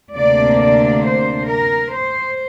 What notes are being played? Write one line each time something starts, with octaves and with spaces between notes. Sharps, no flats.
D2 C3 A#3 D4 D5
D5
C5
A#4
C5